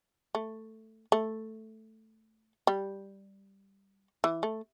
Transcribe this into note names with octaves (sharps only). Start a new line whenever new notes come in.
A3
A3
G3
E3
A3